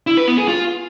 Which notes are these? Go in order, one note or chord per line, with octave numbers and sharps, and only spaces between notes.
E4
B4
B3
G#4
F4